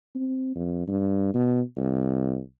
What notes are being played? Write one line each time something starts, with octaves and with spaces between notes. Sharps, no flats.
C4
F2
G2
B2
C2